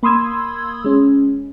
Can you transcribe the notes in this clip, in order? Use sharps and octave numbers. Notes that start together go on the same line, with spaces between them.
A#3 B5 C6 D#6 E6 G#6
G#3 C#4